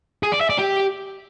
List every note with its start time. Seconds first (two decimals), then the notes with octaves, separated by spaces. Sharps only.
0.23 G#4
0.32 D5
0.41 E5
0.50 D5
0.58 G4